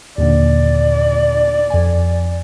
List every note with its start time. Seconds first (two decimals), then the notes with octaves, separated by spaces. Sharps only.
0.18 D#2 A#2 D3 D5
1.70 F2 G#5